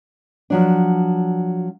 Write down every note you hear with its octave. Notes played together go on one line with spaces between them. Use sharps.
F3 F#3 D4